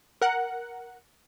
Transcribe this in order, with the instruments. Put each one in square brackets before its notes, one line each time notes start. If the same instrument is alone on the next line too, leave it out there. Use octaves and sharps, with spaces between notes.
[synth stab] A#4 F#5